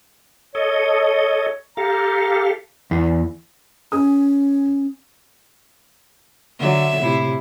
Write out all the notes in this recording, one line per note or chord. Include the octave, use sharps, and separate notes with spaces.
A4 C#5 D#5
G4 A4 F5 A#5
E2
C#4 G#4 D#6
D3 F#3 E5
A2 C3 E4